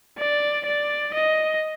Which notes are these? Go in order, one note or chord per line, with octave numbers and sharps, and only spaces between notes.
D5
D5
D#5